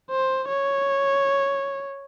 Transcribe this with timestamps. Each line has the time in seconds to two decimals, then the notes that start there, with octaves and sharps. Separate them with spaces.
0.11 C5
0.48 C#5